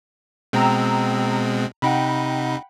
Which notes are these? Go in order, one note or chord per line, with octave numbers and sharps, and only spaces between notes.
B2 G#3 C4 G5 A#5 E6
C3 D#4 F#5 G5 B5